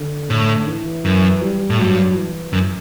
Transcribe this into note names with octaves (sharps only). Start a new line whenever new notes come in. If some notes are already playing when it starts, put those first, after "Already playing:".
Already playing: D3
A2
E3
F#2
G3
A2
G2 F#3
E3
F#2